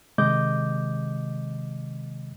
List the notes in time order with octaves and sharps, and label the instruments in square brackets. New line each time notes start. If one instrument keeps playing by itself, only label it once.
[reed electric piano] C3 D#3 G#3 D#5 D6 G6